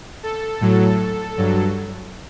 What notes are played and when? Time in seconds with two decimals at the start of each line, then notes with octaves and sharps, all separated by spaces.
0.23 A4
0.61 A2 F#3
1.38 G2 F#3